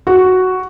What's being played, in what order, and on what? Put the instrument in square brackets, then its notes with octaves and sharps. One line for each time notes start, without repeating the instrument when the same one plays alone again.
[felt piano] F#4